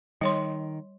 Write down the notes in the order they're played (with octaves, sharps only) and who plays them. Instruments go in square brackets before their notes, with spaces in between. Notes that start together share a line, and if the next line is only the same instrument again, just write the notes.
[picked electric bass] D#3 [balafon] G3 C#5 C6